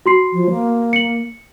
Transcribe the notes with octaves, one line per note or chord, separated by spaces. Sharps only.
F#4 C6 C7
F3
A#3
C#7 F#7